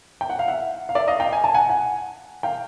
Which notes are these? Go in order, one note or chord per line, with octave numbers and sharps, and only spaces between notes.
G5
F#5
F5
E5 F#5
F5
D5 E5
D#5 F5
F5 G5
G#5
A5
F#5 G#5
F#5 G#5
F5 G5